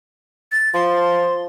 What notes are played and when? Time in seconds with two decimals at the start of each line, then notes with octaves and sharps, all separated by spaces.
0.52 A6
0.74 F3 C6